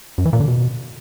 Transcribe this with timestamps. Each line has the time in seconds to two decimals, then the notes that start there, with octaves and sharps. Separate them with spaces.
0.18 F#2
0.26 E3
0.33 A#2
0.40 D3
0.48 B2